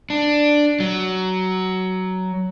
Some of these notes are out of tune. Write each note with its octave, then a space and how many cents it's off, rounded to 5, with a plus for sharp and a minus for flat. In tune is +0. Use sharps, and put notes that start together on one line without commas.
D4 +5
F#3 +15